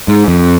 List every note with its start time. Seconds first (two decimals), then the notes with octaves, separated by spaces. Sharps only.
0.08 G#2
0.28 F2